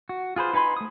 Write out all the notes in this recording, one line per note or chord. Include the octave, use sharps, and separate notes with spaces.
F#4
F4 G#4 B4 C5
D#4 B4 G#5 B5 C6
A3 D#6